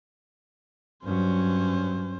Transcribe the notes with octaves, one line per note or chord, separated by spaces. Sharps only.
G2 F#3 C#4 C5